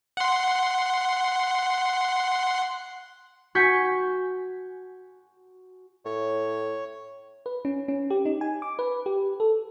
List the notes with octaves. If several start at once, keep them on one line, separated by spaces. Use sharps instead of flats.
F#5 C6
F#4 G#5 C#6 G6 B6
A2 C#5
B4
C#4
C#4
G4
D#4
G#5
D6
B4
G4
A4